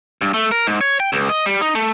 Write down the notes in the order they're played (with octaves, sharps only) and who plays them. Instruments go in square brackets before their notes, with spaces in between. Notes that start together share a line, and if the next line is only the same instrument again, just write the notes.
[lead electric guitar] G2
A3
A#4
G#2
C#5
G5
C#2
D#5
G3
D#4
A3